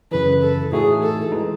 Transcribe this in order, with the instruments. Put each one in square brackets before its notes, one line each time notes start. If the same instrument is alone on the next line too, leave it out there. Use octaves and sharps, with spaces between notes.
[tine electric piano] F#2 C#3 E3 [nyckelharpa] B4
[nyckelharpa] A4
[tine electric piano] A2 E3 A3 D#4 F#4 [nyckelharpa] G#4
[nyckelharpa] A4
[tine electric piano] E3 G#3 D#4